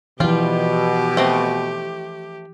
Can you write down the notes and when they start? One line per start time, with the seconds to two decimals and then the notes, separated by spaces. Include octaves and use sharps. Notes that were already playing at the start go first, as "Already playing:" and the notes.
0.20 B2 E3 F3 G3 F4 G4
1.17 A3 C4 D#5